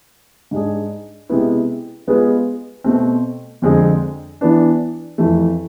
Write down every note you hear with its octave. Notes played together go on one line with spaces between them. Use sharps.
G#2 G#3 D4 G#4
C3 G#3 B3 E4
G#3 B3 F4 G#4 B4
B2 A3 C4
F2 D3 G#3 C4 G#4
E3 B3 D4
F2 E3 A3